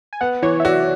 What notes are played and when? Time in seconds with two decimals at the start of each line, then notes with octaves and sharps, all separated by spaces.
0.13 G#5
0.21 B3 F#5
0.42 E3 C#5
0.60 E5
0.65 F#4 D5